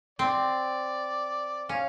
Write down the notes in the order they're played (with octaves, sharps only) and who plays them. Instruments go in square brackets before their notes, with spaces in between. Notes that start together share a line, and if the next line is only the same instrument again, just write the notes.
[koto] C4 [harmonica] D5
[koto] C#4 [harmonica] F5